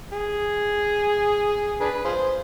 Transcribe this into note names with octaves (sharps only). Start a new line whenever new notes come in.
G#4
D4 G#4 B4
F4 G#4 C5